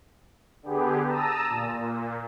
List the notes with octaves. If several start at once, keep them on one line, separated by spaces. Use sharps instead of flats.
D3 B3 G4 G#4
A5 A#5 D#6 E6
A#2